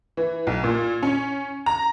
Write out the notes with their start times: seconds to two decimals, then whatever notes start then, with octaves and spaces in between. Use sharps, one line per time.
0.17 E3
0.47 B1
0.64 A#2
1.03 C#4
1.66 A#5